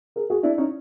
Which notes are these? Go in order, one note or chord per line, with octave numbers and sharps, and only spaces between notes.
G#4 A#4
F#4 G#4
D4 E4
C#4 D#4